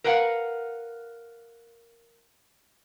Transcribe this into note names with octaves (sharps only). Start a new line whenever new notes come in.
A#4 B4 F5 F#5